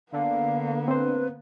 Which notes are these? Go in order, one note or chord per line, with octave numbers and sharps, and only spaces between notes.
D3 A#3 B3 F5
C4 B4 C5